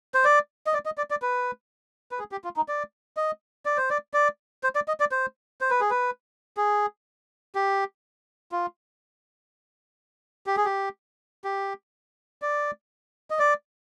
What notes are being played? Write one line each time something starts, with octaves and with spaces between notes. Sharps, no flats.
C5
D5
D#5
D5
D#5
D5
D5
B4
B4
G#4
G4
F4
D#4
D5
D#5
D5
C5
D5
D5
C5
D5
D#5
D5
C5
C5
B4
G#4
B4
G#4
G4
F4
G4
G#4
G4
G4
D5
D#5
D5